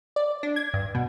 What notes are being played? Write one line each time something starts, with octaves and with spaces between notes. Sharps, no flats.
D5
D4
G#6
G2
B2